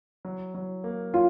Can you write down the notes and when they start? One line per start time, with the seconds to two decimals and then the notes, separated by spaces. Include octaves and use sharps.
0.25 F#3
0.55 F#3
0.84 A#3
1.14 C#4 F4